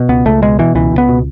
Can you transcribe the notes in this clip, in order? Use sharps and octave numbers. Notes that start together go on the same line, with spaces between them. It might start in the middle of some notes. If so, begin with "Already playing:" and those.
Already playing: B2
C#2 B3
C#2 A3
B2 G#3
B2 E3
C#2 E3
C#2
B3
B2